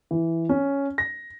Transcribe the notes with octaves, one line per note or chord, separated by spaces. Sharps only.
E3
C#4
A#6